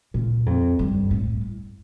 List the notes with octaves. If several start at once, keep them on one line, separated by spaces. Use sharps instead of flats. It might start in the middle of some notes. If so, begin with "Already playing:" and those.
A#2
F2
G2
A2